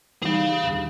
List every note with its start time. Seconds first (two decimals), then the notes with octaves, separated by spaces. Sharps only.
0.22 E3 G3 D#4 G#4 F5
0.64 D#2 D3